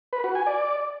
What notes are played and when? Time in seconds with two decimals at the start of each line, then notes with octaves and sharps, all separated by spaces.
0.13 B4
0.24 F#4
0.35 G#5
0.47 D5